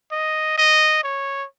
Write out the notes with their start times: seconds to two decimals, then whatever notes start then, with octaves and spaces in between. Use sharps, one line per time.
0.12 D#5
0.58 D#5
1.04 C#5